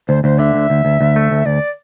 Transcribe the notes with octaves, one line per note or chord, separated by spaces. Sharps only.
D2 C5
D2 C5
D3 E5
D2
D2
D2
D2
A3
D2
D2 D5